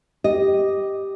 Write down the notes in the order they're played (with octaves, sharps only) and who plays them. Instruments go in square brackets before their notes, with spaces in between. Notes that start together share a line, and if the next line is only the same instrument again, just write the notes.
[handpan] G4 [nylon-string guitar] D#5